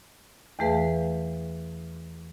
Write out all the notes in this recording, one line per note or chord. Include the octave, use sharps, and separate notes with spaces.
E2 E3 A3 G#4 B4 F5